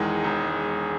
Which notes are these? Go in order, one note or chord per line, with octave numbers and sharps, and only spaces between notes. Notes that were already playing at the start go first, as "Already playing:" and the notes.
Already playing: E1 E2 D#3 G#3
E1